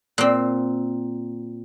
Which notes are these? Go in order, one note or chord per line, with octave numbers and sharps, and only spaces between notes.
A#2 C4